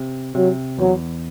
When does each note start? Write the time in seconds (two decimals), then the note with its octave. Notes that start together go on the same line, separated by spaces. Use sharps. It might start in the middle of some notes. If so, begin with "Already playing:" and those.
Already playing: C3
0.35 C3 F#3
0.79 E2 F#3